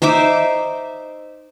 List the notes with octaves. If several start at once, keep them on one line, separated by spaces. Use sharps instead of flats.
D#4 C5 E5 D6